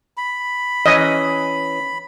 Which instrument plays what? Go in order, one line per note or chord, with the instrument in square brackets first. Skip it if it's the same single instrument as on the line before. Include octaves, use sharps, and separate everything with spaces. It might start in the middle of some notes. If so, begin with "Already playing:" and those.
[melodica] B5
[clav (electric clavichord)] E3 C#4 [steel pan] D#5